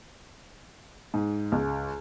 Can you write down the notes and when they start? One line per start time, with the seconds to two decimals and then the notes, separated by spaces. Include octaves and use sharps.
1.14 G#2
1.52 C#2